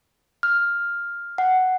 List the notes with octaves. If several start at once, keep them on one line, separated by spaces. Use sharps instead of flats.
F6
F#5